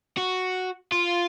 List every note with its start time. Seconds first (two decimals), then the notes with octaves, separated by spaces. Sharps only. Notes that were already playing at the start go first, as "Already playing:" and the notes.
0.18 F#4
0.92 F4